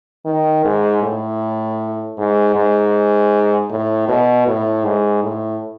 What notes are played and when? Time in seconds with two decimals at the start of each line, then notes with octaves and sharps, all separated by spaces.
0.25 D#3
0.64 G#2
1.02 A2
2.17 G#2
2.56 G#2
3.70 A2
4.08 B2
4.47 A2
4.85 G#2
5.23 A2